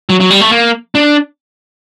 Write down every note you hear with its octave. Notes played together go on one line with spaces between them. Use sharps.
F#3
F#3
G3
A3
A#3
D4